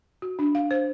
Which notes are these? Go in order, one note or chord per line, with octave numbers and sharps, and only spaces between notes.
F#4
D4
F5
C5